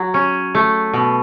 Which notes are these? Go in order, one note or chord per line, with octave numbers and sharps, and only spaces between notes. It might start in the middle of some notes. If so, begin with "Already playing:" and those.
Already playing: F#3
C#4
A3
B2